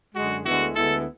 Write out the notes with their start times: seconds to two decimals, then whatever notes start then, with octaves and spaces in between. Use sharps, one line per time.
0.15 F#2 D3 G#3 F#4
0.45 D2 D3 G#3 B3 E4 F#4
0.75 D2 D3 G#3 B3 E4 A4